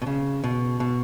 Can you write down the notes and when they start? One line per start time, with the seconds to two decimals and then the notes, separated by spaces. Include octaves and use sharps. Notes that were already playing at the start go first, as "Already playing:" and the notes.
0.02 B2
0.07 C#3
0.44 B2
0.80 B2